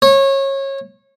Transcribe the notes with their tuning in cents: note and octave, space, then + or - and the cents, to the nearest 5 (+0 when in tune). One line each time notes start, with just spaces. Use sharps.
C#5 -25